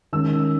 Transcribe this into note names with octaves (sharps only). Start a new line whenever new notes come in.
D#3 G#3 C#4 E6